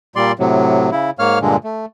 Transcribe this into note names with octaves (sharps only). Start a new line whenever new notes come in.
A#2 G3 D5 C6
A2 C3 F#3
C#3 E4
G#2 A#3 C#5 F5 F6
G2 A#2 D3 G#3
A3